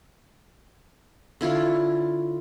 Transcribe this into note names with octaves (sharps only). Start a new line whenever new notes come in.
D3 E4 F4 C#5